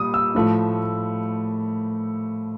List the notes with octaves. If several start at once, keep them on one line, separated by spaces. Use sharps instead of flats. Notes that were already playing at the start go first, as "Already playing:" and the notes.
Already playing: A#2 G3 D#6
E6
A2 F3 A3